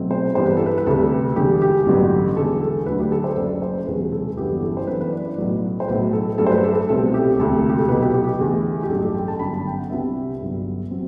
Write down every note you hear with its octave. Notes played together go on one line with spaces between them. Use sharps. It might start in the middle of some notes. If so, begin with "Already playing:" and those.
Already playing: B1 B2 F#3 A3 C4
C5
G2 E3 G3 B3 C5
B4
A4
B4
B4
D2 C3 G3 A4
E1 E2 D3 G3 G4
G4
A1 G2 D3 F#3 B3
E1 E2 D3 A4
A4
D2 D3 F#3 A3 D4 B4
G4
A4
C5
F#1 F#2 F#3 D5
C5
E1 E2 C3 F#3 B4
A4
G1 F#2 E3 B3 D4 G4
A4
C5
F#2 E3 B3 D4 B4
B4
D5
D5
B1 A2 F#3
C5
B1 A2 F#3 B4
A4
G2 F#3 A3 D4 A4
C5
B4
A4
A4
C2 B2 A3 C4 A4
G4
E1 D2 C3 A4
G4
A4
B1 B2 F#3 B4
G4
G4
G4
E2 D3 A3
G4
A1 G2 F#3 A4
A4
G5
A5
G1 F#2 D3 B5
A5
G5
F#5
C2 C3 G3 B3 D4 E5
G1 G2 F#3
F#3 C4